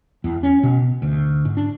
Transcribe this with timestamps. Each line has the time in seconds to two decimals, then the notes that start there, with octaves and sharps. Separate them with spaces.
0.24 E2
0.43 C#4
0.63 B2
1.02 D2
1.45 G#2
1.57 D4